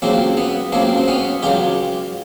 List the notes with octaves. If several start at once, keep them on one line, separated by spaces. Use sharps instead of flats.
C#2 C#3 F#3 A#3 C4
B3
C#2 C#3 F#3 A#3 C4
C4
B3 C#4
C#2 C#3 F#3 F4 G4